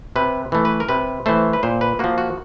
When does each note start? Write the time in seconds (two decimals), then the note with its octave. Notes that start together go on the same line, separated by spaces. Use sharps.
0.16 C3 B4
0.52 E3 A3
0.65 B4
0.80 A#4
0.89 C3 B4
1.26 E3 A3 C5
1.53 B4
1.63 A#2 C5
1.81 B4
1.99 F3 A#3 F#4
2.18 F#4